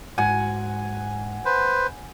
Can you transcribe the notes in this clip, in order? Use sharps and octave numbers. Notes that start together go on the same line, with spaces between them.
G#2 F#5 G#5
B4 C5